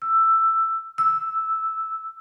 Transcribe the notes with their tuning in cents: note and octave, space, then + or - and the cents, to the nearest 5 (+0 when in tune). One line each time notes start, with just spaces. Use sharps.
E6 +10
E6 -5